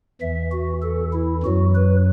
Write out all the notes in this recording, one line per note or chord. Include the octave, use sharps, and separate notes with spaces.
E2 E3 E5
F#4
A4
E4
F#2 F#3 F#4
B4